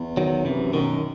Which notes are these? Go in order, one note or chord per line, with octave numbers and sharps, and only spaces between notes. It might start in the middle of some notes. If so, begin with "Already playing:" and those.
Already playing: E2
D#3 F#3
F#2 C3 E3
F#2 B2 D#3